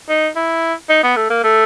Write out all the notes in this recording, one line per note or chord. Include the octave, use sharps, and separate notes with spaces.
D#4
E4
D#4
B3
A3
A#3
A3